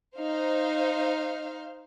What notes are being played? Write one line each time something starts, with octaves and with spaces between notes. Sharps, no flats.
D#4 C5 F5